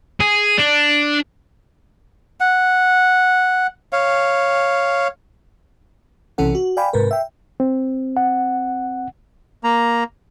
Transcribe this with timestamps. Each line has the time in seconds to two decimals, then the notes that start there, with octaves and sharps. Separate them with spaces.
0.20 G#4
0.58 D4
2.40 F#5
3.93 C#5 F5
6.38 B1 C3 E3 C#4 A4 F#5
6.55 F#4
6.77 D5 F5 G5 G#5 B5
6.93 G#2 C3 A#4 B4
7.11 E5 G5
7.60 C4
8.17 F#5
9.64 A#3 A#5